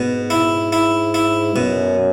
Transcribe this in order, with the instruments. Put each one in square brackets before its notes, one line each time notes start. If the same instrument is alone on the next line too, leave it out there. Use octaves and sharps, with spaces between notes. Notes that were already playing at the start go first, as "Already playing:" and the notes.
Already playing: [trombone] G#2 [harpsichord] B2
[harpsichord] E4
E4
E4
[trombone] F#2 [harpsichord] B2